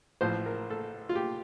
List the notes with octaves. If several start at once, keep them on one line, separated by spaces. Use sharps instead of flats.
A1 A2 F3 C5
A#4
A4
F4
G4